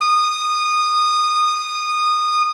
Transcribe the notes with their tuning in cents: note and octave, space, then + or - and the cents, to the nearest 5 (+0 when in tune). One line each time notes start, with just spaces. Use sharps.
D#6 -20